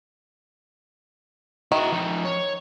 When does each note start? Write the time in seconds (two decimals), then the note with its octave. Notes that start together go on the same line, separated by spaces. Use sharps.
1.72 D#3 E4 F#4
1.92 F3 D#4
2.25 C#5